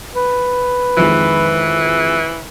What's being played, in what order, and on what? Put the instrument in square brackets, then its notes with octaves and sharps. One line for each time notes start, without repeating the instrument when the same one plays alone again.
[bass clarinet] B4
[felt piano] F2 D#3 G#3 [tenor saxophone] E3